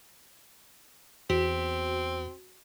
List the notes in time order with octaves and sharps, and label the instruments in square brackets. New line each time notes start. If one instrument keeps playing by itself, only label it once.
[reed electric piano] E2 [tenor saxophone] C4 [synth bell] F#4